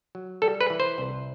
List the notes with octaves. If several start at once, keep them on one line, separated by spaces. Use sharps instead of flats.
F#3
G3 A4
B4
E3
C5
C2